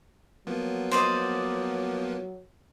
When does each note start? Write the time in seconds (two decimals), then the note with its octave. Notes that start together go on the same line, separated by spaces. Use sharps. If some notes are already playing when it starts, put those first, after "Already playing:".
0.47 F3 F#3 A#3 B3
0.91 C5 D5 D#5